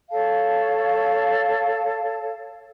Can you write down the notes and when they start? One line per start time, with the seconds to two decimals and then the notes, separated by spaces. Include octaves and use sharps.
0.11 A4 C#5 F5 A5